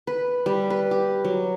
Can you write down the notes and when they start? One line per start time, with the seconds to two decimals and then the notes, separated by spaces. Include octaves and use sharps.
0.07 B4
0.46 G3
0.70 B4
0.91 G4
1.24 F#3